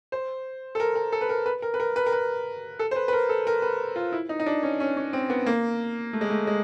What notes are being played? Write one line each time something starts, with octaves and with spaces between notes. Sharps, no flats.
C5
A4
A#4
A#4
A4
B4
A#4
B4
A#4
B4
A#4
B4
A#4
B4
A4
C5
B4
B4
A#4
A4
A#4
B4
F4
E4
D#4
D#4
D4
C#4
C#4
C#4
C4
B3
A#3
A3
G#3
A3
G#3